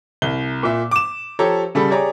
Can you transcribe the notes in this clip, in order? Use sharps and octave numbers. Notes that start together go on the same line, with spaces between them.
C2 G7
A#2 E5
D6 E7
F3 G4 A4 C#5 A#5
C#3 G3 A4 B5
G4 G#4 C#5 D5 A#5